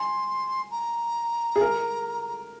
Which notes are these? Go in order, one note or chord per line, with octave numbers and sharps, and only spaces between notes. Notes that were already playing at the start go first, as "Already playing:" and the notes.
Already playing: G#5 C6
A#5
G#4
A#4